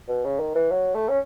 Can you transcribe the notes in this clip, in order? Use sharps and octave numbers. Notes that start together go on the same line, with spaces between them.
B2
C#3
D#3
E3
F#3
A3
C#4